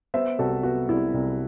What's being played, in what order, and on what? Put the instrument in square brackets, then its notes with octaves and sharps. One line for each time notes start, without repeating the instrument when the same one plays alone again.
[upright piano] B3 C5 E5
C2 F#4 A4
B3 F#4
C2 E4
C2